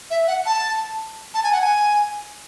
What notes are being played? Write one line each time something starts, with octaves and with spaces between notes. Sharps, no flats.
E5
F#5
A5
A5
G#5
F#5
G#5